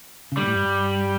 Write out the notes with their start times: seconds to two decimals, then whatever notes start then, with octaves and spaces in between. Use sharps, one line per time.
0.32 C#3
0.37 D3 G3
0.41 A#2
0.47 A2
0.55 G2
0.65 G2